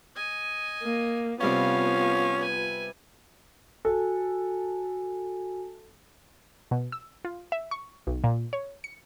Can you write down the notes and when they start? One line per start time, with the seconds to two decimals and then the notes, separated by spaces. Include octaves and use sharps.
0.16 D#5 G#5
0.83 A#3
1.41 C3 F3 G3 B3 C#4 F4 F5
2.39 B4 G#5
3.85 F#4 A4 G#5
6.71 B2
6.92 E6
7.25 F4
7.52 E5
7.71 C#6
8.07 B1
8.24 A#2
8.53 C#5
8.84 C#7